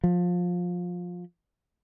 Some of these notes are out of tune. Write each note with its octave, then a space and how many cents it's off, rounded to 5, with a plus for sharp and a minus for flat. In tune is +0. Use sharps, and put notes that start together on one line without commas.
F3 +20